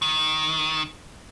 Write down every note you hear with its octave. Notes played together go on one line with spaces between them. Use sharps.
D#3